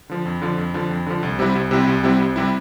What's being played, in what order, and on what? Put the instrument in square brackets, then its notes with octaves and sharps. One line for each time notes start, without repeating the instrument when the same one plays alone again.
[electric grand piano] D3 F3
F2
D3 F3
F2
D3 F3
F2
D3 F3
C2
C3 G3 C4 E4
C2
C3 G3 C4 E4
C2
C3 G3 C4 E4
C2
C3 G3 C4 E4